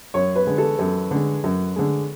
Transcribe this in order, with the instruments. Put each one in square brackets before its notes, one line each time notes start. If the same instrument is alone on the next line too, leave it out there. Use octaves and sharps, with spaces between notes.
[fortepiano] F#2 [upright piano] C#5
[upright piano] B4
[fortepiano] D3 G#3
[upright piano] A4
[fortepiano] F#2 [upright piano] A4
[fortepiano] D3 G#3
F#2
D3 G#3